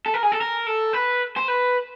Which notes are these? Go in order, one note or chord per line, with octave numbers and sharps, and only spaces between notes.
A4
A#4
G#4
A4
A#4
A4
B4
C5
B4